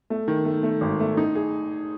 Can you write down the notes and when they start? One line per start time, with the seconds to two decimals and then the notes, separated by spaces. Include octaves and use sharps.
0.10 A3
0.28 D#3
0.45 A3
0.63 A3
0.81 G#1
1.00 A3
1.17 D#4
1.35 G#4